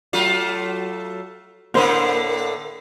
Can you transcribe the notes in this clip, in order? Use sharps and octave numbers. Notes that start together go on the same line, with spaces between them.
F#3 A3 F4
A2 D3 A#3 A#4 C5